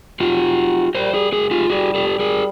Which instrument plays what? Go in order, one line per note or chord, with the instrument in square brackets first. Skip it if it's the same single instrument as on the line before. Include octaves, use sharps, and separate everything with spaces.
[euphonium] F#3 [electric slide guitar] F4 G4
[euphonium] G3 [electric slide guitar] A#4 C5
[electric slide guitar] F#4 G#4
[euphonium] G#3 [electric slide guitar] F#4 G#4
[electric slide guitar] F4 G4
[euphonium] G3 [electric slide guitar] F#4 G#4
[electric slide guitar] G4 A4
[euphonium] G3
[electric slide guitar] G#4 A#4